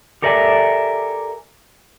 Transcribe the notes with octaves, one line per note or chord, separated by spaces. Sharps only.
G4 A4 A#4 D5 E5 G#5